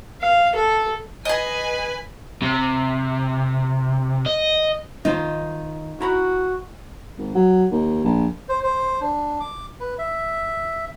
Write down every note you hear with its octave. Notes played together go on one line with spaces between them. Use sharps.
F5
A4
G#4 B4 D#5 G#5
C3
D#5
D#3 D#4 F4 C5
E4 F#4 A#5 B5
G#1
F#3
D#2
A#1
C5
C5
D4
D6
B4
E5